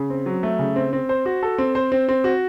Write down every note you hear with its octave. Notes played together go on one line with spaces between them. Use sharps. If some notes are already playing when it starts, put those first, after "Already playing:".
Already playing: C#3
C4
F#3
A3
C#3
C4
C4
C5
F#4
A4
C4
C5
C4
C4
F#4